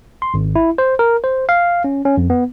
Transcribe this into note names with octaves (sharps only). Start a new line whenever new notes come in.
C6
G#1
E4
C5
A#4
C5
F5
C#4
C#4
F2
B3